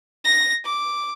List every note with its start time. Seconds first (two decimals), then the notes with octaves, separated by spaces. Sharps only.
0.25 A#6
0.65 D6